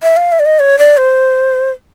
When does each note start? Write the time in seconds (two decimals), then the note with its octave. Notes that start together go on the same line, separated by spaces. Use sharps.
0.03 E5
0.17 F5
0.32 E5
0.39 D5
0.46 D#5
0.59 C#5
0.79 D5
0.97 C5